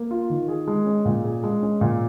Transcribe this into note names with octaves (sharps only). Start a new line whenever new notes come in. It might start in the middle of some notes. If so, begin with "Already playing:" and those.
Already playing: A#3
F4
D#3
G#4
G#3
C#4
A#2
G#4
G#3
C#4
A#2